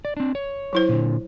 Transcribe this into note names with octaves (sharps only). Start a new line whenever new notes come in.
D5
C4 D4
C#5
F#3 E4 C5
A#2 D3